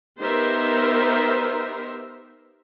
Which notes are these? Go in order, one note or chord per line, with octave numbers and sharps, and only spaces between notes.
B3 D#4 G4 A#4 C5 E5